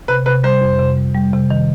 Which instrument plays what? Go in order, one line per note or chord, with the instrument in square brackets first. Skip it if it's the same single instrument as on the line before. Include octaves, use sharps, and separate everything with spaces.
[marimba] C3 [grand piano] B4
[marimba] C3 [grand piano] B4
[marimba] G3 [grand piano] C5
[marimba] F2
C3
G3
G3
C3
D#3